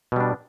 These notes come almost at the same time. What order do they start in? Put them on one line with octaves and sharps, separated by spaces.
B2 G3 D4